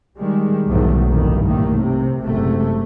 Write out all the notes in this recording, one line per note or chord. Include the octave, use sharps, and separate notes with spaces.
D#3 G3 G#3
B1 E2 G#2 D#3 F#3 A3
F1 G2 A#2 D#3
C2 A2 D#3 A3 A#3
C3
F#1 G#2 C3 A3